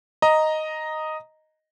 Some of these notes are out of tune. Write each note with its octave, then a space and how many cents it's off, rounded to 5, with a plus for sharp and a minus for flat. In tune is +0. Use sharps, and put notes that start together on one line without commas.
D#5 +0 A#5 +0